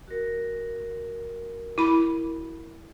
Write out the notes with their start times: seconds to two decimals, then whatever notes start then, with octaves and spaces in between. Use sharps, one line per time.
0.08 F#4 A#4
1.78 E4 B5